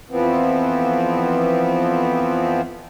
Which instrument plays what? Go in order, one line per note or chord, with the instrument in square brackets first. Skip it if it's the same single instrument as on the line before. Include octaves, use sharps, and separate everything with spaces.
[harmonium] F2 E3 F3 B3 C4